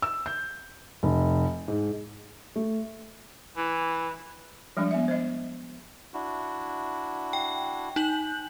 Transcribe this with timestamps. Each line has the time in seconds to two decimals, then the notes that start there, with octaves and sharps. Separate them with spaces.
0.02 E6
0.26 G6
1.03 F1
1.68 G#2
2.56 A3
3.57 E3
4.77 F3 G3 G#3 D4
4.91 B3 E5
5.08 C5 D#5
6.14 D4 E4 F#4
7.33 G5
7.96 D#4 G6 F#7